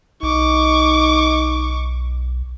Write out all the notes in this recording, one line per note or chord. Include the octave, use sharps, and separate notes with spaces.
B1 D#4 C#6 D6